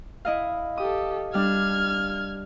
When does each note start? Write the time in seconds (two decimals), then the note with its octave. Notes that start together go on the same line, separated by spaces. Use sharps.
0.25 E4 D#5 F5
0.78 G4 A4 D#6
1.34 G3 D4 F6 G#6